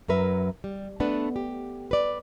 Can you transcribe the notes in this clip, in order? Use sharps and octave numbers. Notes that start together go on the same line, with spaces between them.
F#2 F#3 A#4 B4 E5
G3
A3 B3 D4 B4
G4
B4 D5